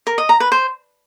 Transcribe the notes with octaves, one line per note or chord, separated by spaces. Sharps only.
A#4
D#5
A#5
B4
C5